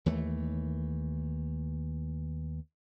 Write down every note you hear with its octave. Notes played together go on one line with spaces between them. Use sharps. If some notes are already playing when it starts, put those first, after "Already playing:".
D#2 E3 A3